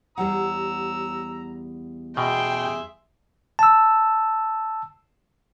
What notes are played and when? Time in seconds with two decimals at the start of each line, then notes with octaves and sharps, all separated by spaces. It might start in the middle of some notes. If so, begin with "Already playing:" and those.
0.18 E2 G3 F#5 A#5 E6
2.17 B2 G#4 E5 G5 C6
3.59 A5 E6